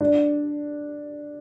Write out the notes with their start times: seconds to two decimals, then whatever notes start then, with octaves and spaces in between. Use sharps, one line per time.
0.01 D4